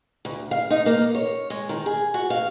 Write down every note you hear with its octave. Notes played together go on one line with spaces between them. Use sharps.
D2
F5
D#4
A#3
C#5
G#3
D#3
G#4
F#4
F5